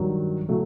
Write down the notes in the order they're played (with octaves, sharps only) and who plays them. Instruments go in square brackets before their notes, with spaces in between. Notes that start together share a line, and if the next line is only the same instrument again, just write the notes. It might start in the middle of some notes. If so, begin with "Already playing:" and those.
Already playing: [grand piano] G2 D#3 F#3
C#3 F#3 A3